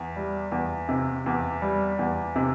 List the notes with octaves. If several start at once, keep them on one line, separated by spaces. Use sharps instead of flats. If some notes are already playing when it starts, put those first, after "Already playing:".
Already playing: E2
G3
E2
C3
E2
G3
E2
C3